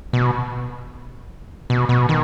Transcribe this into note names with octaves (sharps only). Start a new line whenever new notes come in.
B2
B2
B2
D#3